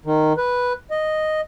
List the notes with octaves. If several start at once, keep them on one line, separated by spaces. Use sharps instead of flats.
D#3
B4
D#5